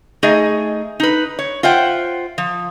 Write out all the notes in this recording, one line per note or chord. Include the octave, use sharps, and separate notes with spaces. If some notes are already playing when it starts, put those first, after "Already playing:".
A3 D#4 G#4 D#5 G#5
D#4 B4
C#5
F4 C5 E5 F#5 G5
F3